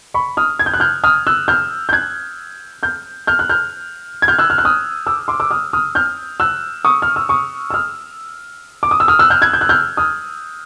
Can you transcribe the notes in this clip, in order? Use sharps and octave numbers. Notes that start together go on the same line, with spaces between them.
B5 C#6
D#6 F6
G#6
G6
F#6
F6 G6
D#6 F6
E6 F#6
F6 G6
G6
F#6 G#6
F6 G6
F6 G6
F#6
F6 G6
G#6
F6 G6
E6 F#6
F6
F#6
D#6 F6
D6 E6
C6 D6
D6 E6
D#6 F6
D#6 F6
F6 G6
E6 F#6
C#6 D#6
F6
E6
C#6 D#6
E6
D#6 F6
D6
D#6
E6
D#6 F6
E6 F#6
F6 G6
F#6 G#6
G6
F#6
F6 G6
D#6 F6